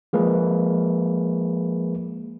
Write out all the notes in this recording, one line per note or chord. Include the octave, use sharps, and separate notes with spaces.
F3 G#3 A#3 G#4 B4